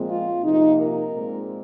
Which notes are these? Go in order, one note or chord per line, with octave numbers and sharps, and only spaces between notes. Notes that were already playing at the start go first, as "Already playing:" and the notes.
Already playing: A#2 F3 G#3 C4
F4
C3 F3 A#3 D#4
A#4
A#2 G#3 C4